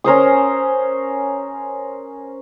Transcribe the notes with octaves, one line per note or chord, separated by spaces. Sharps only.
C#4 A#4 C5 D#6